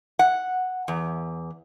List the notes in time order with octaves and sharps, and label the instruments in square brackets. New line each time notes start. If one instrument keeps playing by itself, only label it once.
[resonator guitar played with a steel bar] F#5
E2